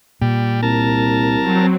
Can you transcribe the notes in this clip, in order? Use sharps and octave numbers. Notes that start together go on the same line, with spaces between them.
A#2 G3
C2 A#4 A5
F#3 C4